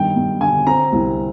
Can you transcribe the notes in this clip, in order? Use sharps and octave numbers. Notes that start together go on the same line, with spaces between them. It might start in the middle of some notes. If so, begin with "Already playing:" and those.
Already playing: G2 D#3 G5
G2
D3 G#5
C4 A#5
C2